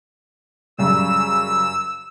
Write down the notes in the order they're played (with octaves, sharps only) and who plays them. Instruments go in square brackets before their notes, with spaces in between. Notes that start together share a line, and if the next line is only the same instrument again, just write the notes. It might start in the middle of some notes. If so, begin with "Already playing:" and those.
[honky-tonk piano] F#2 C#3 G3 [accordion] E6